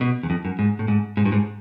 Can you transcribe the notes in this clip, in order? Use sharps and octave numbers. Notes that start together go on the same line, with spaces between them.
B2
E2
F2
F#2
G#2
A2
G#2
G#2
G2
G#2